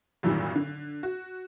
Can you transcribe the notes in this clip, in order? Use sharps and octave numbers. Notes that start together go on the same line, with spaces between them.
G#1 F#2 A#2 D#3 E3 G3
D3
F#4